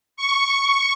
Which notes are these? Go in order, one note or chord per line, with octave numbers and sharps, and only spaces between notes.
C#6